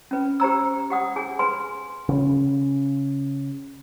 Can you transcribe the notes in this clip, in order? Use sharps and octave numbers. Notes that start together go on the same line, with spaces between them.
C#4 B4
G4 C5 A#5 E6
G4 F#5 D#6
G#4 G#5
B4 G#5 C6
C#3 C#4